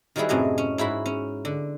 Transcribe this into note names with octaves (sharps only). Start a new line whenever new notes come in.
D#3 F#3 G3 E4 G#4 B4
F#2 A2 C3 D#5 G#5
C#4
G#2 E4 F#4 B5
C#4
D3